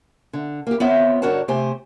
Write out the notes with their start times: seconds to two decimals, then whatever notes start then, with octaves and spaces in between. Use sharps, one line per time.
0.33 D3
0.67 A#3 G4
0.80 B3 C4 F4 C#5 E5
1.22 G2 D3 F#4 A#4 C#5 A5
1.48 C3 A3 G4 C5 G#5